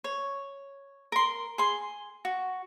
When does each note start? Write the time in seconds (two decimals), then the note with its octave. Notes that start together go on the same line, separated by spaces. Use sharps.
0.04 C#5
1.12 A#4 C6
1.58 G#4 C6
2.25 F#4